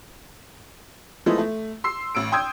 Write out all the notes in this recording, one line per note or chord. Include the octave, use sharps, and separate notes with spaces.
F3 G#3 A3 B3 D#4 E4
A3
C6 E6 C7
A1 E6 D7
G5 C6 D#6 E6 G6 G#6